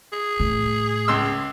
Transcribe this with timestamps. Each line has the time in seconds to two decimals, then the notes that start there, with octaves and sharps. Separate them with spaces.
0.13 G#4
0.40 A2
1.08 C#2 C6 E6